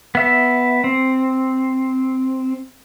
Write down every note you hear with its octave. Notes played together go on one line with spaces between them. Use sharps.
B3 E5
C4